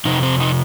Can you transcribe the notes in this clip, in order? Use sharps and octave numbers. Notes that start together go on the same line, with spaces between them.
F2 C3 D#4
C4
D#4